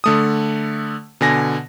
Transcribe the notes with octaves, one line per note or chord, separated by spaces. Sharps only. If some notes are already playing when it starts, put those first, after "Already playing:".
D3 A3 D#6
B2 D3 G#5 A#6